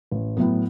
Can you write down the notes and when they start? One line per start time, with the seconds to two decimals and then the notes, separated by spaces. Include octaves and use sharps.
0.11 A1
0.37 A2 F#3 B3